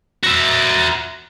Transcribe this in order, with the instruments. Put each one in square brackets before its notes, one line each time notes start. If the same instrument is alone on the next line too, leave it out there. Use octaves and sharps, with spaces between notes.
[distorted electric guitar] F#4 E5